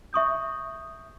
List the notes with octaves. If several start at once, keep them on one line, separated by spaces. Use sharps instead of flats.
E5 C#6 D#6 G6